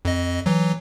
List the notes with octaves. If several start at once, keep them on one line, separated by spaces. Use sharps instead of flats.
F2 D#5
E3 F#3